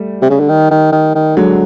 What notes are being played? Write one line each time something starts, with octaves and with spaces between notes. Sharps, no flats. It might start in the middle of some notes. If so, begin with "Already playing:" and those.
Already playing: G3 A3
C3
C#3
D3
D#3
D#3
D#3
D#3
D3 F#3 G#3